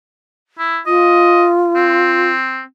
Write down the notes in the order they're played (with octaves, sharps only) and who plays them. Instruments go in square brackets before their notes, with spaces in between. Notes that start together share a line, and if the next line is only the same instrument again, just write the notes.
[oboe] E4
[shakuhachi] F4 [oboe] D#5
[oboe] C4